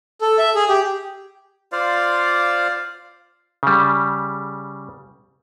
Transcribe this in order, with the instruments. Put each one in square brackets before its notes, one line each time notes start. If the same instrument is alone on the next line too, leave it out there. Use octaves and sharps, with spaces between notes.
[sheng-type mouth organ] A4
E5
G#4
G4
[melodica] F4 C5 D5 F5
[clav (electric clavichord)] C#3 G3